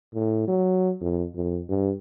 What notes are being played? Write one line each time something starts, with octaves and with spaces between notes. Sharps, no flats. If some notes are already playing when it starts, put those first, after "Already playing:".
A2
F#3
F2
F2
G2